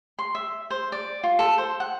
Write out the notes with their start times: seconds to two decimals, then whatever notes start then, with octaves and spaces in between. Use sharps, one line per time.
0.19 C6
0.35 E5
0.70 C5
0.92 D5
1.23 F4
1.39 A4
1.58 C5
1.80 F#5